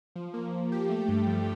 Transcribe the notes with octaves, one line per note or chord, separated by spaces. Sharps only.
F3
A#3
A#3
G4
A3
G2
F3